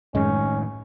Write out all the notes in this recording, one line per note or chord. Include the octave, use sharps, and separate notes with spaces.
F#2 A2 D#3 G#3 C#4